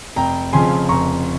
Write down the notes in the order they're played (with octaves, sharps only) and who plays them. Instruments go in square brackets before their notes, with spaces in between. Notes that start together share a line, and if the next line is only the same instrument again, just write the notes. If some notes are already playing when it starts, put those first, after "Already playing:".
[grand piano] F1 G5 A#5
F2 C#3 F3 G#5 C6
F1 A#5 C#6